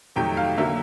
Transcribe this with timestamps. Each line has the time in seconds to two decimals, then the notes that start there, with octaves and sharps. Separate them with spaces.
0.16 F2 C3 D#3 F#3 A3 G5
0.37 F5
0.58 D3 F#3 A#3 E5